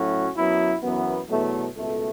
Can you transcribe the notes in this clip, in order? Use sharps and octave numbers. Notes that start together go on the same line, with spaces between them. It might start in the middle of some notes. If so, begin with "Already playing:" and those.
Already playing: A2 F#3 A3 C#4 F#4
F#2 F#3 B3 E4
F#2 E3 B3
E2 B2 F#3 A3
C#2 B2 A3